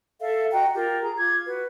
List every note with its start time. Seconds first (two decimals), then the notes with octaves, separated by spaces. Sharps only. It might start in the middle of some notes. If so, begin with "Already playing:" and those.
0.21 A4 E5 F5
0.52 F#4 D#5 G5 A#5
0.74 F4 G4 A#4
1.02 G#4 A#5
1.17 F4 D6 G#6
1.47 F#4 B4